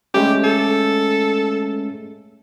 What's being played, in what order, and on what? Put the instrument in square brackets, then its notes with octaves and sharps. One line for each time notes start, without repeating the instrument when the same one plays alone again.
[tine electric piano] G#3 A3 C#4 [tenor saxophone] G4
[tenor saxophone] A4